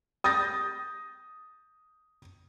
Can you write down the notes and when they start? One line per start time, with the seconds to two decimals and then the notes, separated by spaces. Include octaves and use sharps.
0.24 D#6 G6 A6 A#6